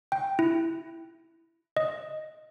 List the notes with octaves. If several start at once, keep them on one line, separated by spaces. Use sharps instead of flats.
G5
E4
D#5